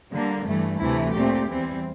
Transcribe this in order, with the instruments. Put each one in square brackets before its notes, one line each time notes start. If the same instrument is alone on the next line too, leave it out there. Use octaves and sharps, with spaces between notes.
[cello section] D3 G3 A#3
G2 E3 A3
D2 C3 E3 A3 E4
A#2 A3 C4 G4
E2 E3 G3 C4